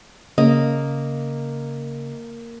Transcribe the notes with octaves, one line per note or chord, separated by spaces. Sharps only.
C#3 A#3 D#5